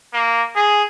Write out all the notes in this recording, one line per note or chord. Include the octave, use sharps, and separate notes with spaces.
A#3
G#4